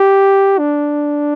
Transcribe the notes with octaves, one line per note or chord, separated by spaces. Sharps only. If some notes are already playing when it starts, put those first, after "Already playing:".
Already playing: G4
D4